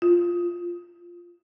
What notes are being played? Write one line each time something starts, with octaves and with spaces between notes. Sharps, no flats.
F4